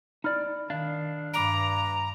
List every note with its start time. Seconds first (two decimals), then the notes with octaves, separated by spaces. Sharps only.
0.24 D#4 D5 B5 F6
0.70 D#3 D4 F5
1.34 G2 A#5 B5 D6 D7